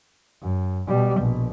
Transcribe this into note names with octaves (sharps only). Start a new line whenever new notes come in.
F#2
B2 G3
A#1 B2